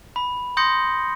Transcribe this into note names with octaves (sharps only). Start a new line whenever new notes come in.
B5
C6 D#6 G6 A#6 C#7